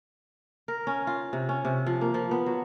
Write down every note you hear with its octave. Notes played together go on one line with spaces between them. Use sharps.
A#4
C#4
F4
C3
C#4
C3
F3
A#3
F3
B3
F#3